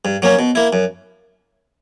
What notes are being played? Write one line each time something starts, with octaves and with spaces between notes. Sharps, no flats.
G2
F#3 A#3 C#4
B2
A#3 E4
F#2